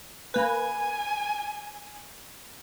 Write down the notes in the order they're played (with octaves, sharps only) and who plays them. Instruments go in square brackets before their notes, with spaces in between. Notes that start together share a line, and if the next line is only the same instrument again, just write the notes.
[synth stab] A#3 B4 [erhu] G#5